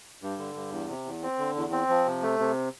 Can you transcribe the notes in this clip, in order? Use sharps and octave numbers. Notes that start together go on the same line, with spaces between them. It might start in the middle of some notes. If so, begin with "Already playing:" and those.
G2
D3
G2
E2
C3
E2
C4
D3
E2
C4
F3
C3
A3
C3